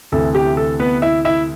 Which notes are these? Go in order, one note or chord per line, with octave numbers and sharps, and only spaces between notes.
D2 C3 E3 A4
G4
A4
B3 B4
E4 E5
E4 E5